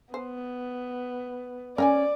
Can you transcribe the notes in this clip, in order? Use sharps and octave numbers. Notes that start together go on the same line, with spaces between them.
B3 C5
C#4 A#4 D5 G5 G#5